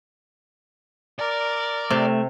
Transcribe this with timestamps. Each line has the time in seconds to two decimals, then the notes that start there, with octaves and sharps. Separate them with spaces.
1.20 A#4 D5
1.90 C3 A3